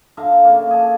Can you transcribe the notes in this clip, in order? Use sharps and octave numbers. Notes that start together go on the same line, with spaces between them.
D3 E5 F5 A#5
C#3 A#3
G#4 A5